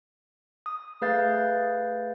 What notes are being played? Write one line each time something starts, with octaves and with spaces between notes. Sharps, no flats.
D#6
A3 G#4 B4 F5 G6 A6